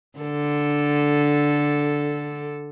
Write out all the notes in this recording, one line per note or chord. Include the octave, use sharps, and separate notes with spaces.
D3 A4